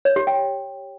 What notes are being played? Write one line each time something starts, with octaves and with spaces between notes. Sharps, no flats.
C#5
G4
G5